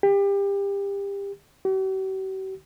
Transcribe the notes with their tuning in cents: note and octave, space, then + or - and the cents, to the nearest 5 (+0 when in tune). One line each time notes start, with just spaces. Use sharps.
G4 +30
G4 -45